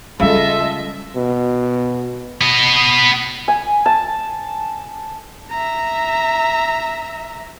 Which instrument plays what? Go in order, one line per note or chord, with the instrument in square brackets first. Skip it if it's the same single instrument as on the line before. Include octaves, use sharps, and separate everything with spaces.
[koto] C#3 [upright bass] G3 G#3 [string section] F4 A4 D#5 [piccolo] E5
[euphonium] B2
[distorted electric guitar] B3 D#5
[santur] G#5
A5
[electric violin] E5 A#5